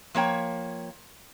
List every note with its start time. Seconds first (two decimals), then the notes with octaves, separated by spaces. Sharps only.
0.15 F3 A#3 C#5 G5